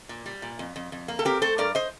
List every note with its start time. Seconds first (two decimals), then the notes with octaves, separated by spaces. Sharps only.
0.09 A#2
0.26 G3
0.42 A#2
0.59 F2
0.76 F2
0.92 F2
1.08 A#3
1.19 A4
1.25 C4 G4 A#4
1.42 A3 A4 C5
1.58 G2 A#4 D5
1.75 C5 D#5